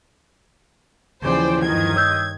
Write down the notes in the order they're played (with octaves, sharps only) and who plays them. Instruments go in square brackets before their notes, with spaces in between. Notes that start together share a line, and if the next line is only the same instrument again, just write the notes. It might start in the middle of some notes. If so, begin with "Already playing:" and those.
[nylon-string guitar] D#2 E3 F3 [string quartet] C#3 D5 G5 [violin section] C5
[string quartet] G2 D#3 D#5 [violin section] G#6
[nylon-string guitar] C#5 [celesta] D#6 E6 G6